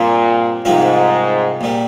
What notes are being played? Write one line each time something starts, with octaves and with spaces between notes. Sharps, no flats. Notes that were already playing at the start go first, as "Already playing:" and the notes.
Already playing: G2 A#2 F3 C4 F4 G#4
C2 G#2 C3 F3 C4 F4
A#1 A#2 G3